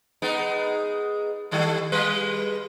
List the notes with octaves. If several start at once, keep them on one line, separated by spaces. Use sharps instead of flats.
G#3 B3 D#4
D#3 G3 A3
G3 G#3 B4